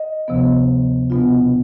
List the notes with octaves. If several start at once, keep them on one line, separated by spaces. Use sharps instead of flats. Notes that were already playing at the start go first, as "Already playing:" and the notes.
Already playing: D#5
D2 C3 F3 B3
B2 B3 D4 F4